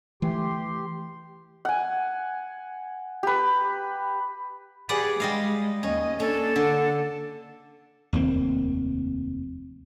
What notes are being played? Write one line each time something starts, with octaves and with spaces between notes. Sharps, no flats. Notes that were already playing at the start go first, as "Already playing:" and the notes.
E3 A3 G4 C6
F#5 G#5
G4 B4
G4 G#4 B4 D5 F#5
G3 G#3 D#5 F5
D#2 C#4 D#5
A#3 C#4 D4 A4
D3
F1 D#2 A#3 C4